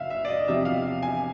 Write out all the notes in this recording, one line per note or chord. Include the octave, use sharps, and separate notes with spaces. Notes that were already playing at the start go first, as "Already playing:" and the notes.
Already playing: F#1 E5 F5
E5
D5
D#5
E2 C3 F3 E5
F5
G#5